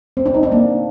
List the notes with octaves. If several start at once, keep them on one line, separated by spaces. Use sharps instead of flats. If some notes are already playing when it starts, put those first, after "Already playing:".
C4
D4
D#4
D4
A#3